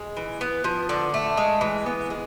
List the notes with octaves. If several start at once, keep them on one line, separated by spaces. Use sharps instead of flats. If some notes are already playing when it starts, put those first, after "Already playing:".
Already playing: G#3
E3
B3
F3
D3
A3
G#3
E3
B3
G#3